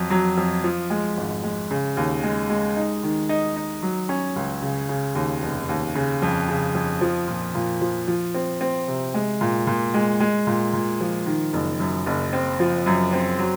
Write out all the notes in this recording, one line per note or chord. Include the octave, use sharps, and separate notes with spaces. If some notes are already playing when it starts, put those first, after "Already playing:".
Already playing: F2 F#3
F#3
F2
F3
G#3
G#1
G#3
C#3
D#2
G#3
G#3
D#4
D#3
D#4
D#4
F#3
C#4
C#2
C#3
C#3
D#2
F1
D#2
C#3
F2
C#3
F2
F3
A#2
A#2
F3
F3
C4
C4
C3
G#3
A#2
A#2
G#3
G#3
A#2
A#2
F3
D#3
F#1
F#2
F#1
C4
F3
F#2
C4
F#3